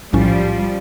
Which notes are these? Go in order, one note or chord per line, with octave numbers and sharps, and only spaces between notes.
B1 A2 F3 G3 C#4